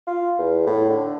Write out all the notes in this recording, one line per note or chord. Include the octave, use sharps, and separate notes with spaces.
F4
E2
A2
D3